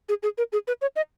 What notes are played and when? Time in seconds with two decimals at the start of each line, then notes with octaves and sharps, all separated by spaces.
0.09 G#4
0.23 G#4
0.38 A#4
0.53 G#4
0.67 B4
0.82 C#5
0.96 D#5